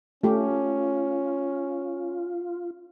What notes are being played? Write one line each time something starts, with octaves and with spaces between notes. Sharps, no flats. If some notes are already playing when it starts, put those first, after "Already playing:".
A3 C#4 F4 G4